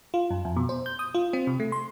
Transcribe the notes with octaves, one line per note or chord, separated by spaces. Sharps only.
F4
F#2
F2
B2
C5
G6
D#6
F4
C4
C3
A3
C6